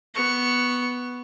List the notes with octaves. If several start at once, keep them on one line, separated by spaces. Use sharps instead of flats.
B3 C#6